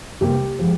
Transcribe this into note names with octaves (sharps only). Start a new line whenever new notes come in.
C2 C3 G3 A#3 G4
F3 G#3